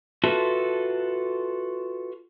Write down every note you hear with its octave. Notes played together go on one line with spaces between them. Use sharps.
F4 F#4 A4 B4 E5